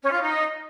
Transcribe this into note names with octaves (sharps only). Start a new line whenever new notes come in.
C#4
F4
D#4